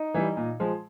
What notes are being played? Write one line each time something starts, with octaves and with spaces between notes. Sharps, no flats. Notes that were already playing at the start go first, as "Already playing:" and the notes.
Already playing: D#4
E3 G3
A#2
F3 G#3